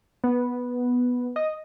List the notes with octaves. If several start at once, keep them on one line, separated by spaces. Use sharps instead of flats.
B3
D#5